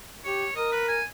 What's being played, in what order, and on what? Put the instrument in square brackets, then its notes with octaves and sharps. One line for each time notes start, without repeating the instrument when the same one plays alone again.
[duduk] G4 [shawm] C#5
[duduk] A#4 [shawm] D#5
[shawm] B4
G#5